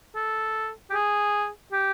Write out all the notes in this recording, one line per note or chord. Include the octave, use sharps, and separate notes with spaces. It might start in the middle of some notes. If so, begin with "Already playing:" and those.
A4
G4
G#4
G4